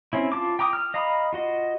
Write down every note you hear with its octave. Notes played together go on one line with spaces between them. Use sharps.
C4 C#4 E4
F4 A5 D6
G5 A#5 D6 D#6
F6
D#5 F5 A#5 B5 D#6
F4 F#4 D#5